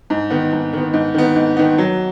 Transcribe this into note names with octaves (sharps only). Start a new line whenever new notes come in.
G#2
D#3 B3
G#2
D#3 B3
G#2
D#3 B3
G#2
D#3 B3
F#3